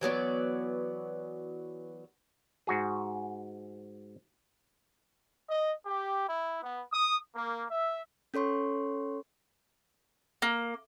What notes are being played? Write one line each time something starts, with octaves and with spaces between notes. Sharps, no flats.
E3 F#3 B3 D5
G#2 F#4 G#4
D#5
G4
E4
B3
D#6
A#3
E5
C#4 A4 C#5 C6 C#6
A#3